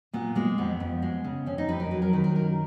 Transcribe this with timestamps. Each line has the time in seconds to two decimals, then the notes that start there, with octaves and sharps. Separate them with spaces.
0.13 A#2 B3
0.35 G#3 A#3
0.58 F2 B3
0.80 F2
1.02 G#3
1.24 C#3
1.46 F2 C#4
1.58 D#4
1.68 F2 B4
1.80 A#4
1.91 F#3 B4
2.02 A#4
2.13 D#3 B4
2.24 A#4
2.35 F#2 A#4